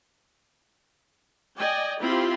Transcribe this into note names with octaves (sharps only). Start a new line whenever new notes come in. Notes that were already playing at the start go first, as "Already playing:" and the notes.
D5 D#5 G5 G#5
C4 E4 F4 G4 B5 C6